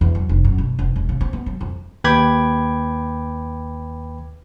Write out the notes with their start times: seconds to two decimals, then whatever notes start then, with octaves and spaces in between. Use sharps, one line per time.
0.01 E2
0.15 F#3
0.29 F1
0.44 F#2
0.58 B2
0.79 E1
0.96 E1
1.09 C#3
1.21 C4
1.33 B3
1.46 F#3
1.61 F2
2.04 D#2 B4 G5 B5 D6 G#6